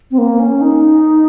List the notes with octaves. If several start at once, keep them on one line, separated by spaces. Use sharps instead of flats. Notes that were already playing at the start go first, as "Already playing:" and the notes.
C4
A#3
C#4
D#4